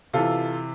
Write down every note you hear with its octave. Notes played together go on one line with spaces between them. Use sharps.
C3 E3 F4 A4